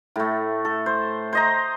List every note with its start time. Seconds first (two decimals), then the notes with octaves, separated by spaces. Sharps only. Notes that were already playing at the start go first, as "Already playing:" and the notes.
0.16 A2 A3
0.65 A4
0.86 C5
1.33 C5 D#5 A#5